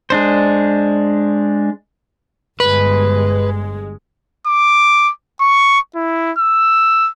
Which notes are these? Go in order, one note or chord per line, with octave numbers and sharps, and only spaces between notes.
G#3 D4 C5
G1 G#3 B4
D6
C#6
E4
E6